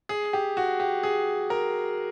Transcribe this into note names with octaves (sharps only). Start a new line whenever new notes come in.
G#4
G4
F#4
G4
G#4
A#4